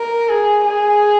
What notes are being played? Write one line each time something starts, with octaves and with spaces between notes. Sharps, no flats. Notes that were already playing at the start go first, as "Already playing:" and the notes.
Already playing: A#4
G#4
G#4